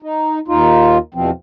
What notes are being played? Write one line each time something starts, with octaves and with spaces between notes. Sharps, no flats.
D#4
D#2 D#4 F4
E2 B2 F3 C4